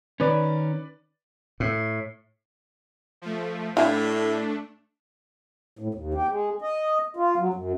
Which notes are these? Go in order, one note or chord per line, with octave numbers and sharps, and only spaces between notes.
D#3 C#4 B4 D5
A2
F3 A3
A2 A3 D4 E4 G#5
A2
D#2
G4
G#3
D#5
F4
F#3
F#2